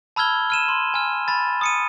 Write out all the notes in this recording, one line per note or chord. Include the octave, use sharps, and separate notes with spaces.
A5 B5 E6 F6 G#6 G7
F6 D#7 E7
C6
G#5 F6
B5 A6
D#6 C#7 D#7